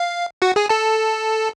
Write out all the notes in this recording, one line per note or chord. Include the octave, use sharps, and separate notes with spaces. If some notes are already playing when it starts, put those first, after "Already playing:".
Already playing: F5
F#4 F#5
G#4 G#5
A4 A5